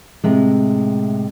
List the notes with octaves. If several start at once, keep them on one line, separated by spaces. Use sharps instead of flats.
A2 C3 G#3